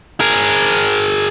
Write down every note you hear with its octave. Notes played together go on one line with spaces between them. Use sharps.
G#4 A#4